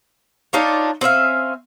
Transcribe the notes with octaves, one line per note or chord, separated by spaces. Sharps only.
D4 D#4 F4 C#5
C4 C#4 E5 F5